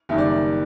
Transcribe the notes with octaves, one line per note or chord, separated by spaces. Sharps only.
F#1 D#3 G3 E5
D5